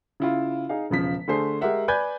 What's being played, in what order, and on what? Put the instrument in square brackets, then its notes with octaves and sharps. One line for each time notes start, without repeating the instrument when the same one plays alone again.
[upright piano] C#3 E4 F4
D#4 G#4 F5
E1 C#3 F3 B6
D3 A3 G#4 C5 C7
G#3 G4 A#4 E5 F#5
B4 D5 G#5 B5 G6 G#6